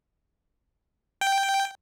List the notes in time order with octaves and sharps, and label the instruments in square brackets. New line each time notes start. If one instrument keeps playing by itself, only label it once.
[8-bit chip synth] G5